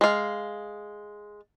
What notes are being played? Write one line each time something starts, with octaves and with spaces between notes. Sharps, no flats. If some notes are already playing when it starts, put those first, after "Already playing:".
G#3 F5